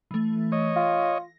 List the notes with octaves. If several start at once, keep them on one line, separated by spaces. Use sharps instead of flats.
E3 A3
C#5 D#5
F4 A#6